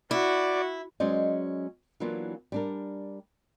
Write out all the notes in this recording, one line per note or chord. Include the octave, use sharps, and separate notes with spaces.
E4 F#4 D5
F#3 G#3 C#4 C5 D5 D#5
E3 F#3 A#3 B3 D4 F4
G3 D4 A#4